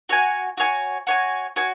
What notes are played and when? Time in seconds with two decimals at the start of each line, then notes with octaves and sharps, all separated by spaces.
0.09 F#4 C#5 G#5
0.57 F#4 C#5 G#5
1.07 F#4 C#5 G#5
1.56 F#4 C#5 G#5